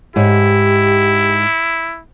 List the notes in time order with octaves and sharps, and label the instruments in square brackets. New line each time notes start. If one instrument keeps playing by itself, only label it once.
[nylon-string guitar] G#2 C#5 [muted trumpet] E4 [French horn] G4